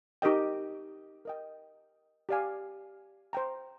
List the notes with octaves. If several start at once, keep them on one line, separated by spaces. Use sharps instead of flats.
D#4 G4 A#4 D#5 G5
A#4 D#5 G5
G4 D5 F5 G#5
C5 G5 A#5